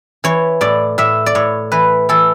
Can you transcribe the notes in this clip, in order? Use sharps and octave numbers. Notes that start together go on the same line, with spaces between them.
E3 C#5
A2 D5
A2 E5
D5
A2 C#5
E3 B4
E3 A4